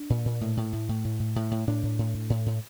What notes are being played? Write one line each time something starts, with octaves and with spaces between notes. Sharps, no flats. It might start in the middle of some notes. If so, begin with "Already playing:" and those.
Already playing: D4
A#2
A#2
A2
A2
A2
A2
A2
A2
A2
A2
A2 D4
A2
A2
A2
A2
A2